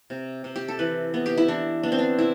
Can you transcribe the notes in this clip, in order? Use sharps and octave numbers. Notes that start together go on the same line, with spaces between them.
C3
C3
G4
A4
E3 B4
B3
G4
E4
E3 D4
B3 D4
C4
D4
C3 E4